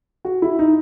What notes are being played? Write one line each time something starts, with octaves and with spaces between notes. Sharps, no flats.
F#4
E4
D#4